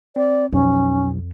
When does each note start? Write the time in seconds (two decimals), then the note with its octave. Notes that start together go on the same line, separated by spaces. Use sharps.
0.16 C4 D5
0.53 B1 F2 C#4